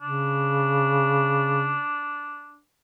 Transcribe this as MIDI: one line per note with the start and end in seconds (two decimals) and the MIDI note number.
0.02 1.81 49
0.02 2.60 62